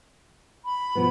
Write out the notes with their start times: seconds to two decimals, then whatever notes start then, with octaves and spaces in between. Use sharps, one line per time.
0.65 B5
0.95 B2 F3 B3